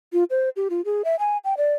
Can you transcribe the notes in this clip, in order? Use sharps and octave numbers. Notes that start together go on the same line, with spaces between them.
F4
C5
G4
F4
G#4
E5
G#5
G5
D5